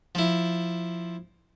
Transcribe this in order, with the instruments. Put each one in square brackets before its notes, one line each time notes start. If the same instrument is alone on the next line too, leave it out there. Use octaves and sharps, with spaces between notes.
[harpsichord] F3 E4